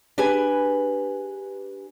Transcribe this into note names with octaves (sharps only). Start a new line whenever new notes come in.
D4 G4 G#4 B4 G#5